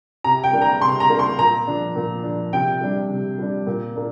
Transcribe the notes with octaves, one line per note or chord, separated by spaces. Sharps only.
C3 A#5
G5
A#3 D4
A#5
C3 C6
A#5
A#3 D4
C6
A#2 A#5
F3 D4
A#2
F3 D4
C3 G5
G3 D4
C3
G3 D4
A#2
A#3 D4